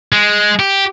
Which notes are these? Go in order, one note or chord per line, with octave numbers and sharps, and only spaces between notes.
G#3
G4